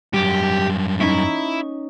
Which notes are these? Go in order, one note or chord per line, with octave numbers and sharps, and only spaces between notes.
F#2 G3 G4
C#4 D#4 E4 E5